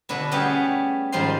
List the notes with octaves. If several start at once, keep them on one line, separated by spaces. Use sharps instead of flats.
B2 D3 D4 E4
G3 A3 B3 C#4 G4 G#4
G#2 D#3 F3 G3 C6